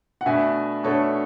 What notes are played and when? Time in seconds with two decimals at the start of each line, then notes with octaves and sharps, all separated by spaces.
0.21 F#5
0.26 B2 A3 D4 E5 G#5
0.84 B2 A3 D4 A4 C#5